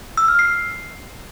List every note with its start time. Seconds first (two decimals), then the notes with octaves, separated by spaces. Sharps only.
0.17 E6
0.28 F6
0.39 C7